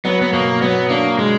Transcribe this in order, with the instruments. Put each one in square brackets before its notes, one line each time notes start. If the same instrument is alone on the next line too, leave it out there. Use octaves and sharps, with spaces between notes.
[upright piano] F#3 [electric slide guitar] B3
[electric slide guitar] B3
[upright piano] B2 [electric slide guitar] A#3
[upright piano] F#3 [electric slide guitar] B3
[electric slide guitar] A#3 [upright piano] D4
[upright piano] B2 [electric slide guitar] G#3